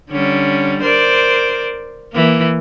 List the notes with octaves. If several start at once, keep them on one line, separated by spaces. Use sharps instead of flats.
D3 G3 C#4
A#4 C5 D5
E3 A#3